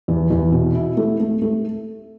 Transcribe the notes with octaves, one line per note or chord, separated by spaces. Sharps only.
E2
E2
B2
E4
A3
A3
A3